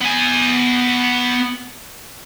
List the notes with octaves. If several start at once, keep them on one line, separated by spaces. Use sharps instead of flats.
B3 G#5